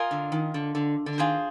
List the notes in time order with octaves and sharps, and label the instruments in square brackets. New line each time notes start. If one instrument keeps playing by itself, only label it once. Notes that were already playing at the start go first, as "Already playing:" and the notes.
Already playing: [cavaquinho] F4 A#4 D#5 G#5
[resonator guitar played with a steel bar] D3
D#3
D3
D3
D3
[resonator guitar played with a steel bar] D#3 [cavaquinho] F4 G#4 C5